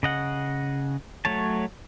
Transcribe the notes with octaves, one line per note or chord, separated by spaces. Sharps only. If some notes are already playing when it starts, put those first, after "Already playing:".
C#3 D#5 F#5
F#3 A3 C#5 A5